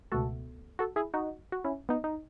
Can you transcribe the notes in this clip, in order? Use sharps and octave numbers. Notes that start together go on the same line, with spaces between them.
C#2 B2 A3 F#4 A4
F#4 A4
E4 G#4
D#4 F#4
F#4
C#4 E4
B3 D#4
D#4